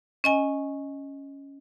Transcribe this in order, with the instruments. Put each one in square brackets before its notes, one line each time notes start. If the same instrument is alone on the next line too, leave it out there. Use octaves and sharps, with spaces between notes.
[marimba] C#4 D#5 G#5